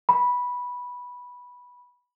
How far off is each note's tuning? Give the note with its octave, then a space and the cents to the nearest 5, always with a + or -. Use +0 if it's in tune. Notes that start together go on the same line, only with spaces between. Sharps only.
B5 -10